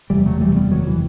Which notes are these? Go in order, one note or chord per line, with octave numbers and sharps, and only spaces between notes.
F#1 E2 C3 E3 G3
F#3 A3
E3 G3
G3 B3
D#3 F#3
E3